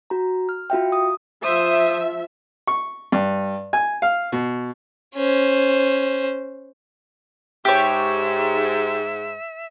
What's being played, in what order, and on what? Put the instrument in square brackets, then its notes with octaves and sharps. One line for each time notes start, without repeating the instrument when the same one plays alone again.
[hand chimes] F#4 A#5
F6
F4 F#4 E5 G5
D#6
[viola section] F3 E5 [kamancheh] C5 D#6
[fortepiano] C#6
G2
G#5
F5
B2
[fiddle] C#4 C5
[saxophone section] G#2 [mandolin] G4 C#5 [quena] E5